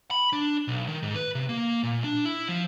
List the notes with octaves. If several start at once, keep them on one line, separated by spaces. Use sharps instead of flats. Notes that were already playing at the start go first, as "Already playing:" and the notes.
B5
D4
B1
D#3
G#2
B4
C3
A#3
A#2
D4
E4
F3